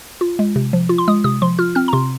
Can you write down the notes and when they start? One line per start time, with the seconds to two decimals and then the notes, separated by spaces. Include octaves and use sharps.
0.21 F4
0.39 G#3
0.56 C3
0.73 F3
0.89 F4
0.98 C6
1.08 G#3 D#6
1.24 C3 D#6
1.42 F3 C6
1.59 F4 F6
1.75 C4 F6
1.88 A#5
1.93 C3 C6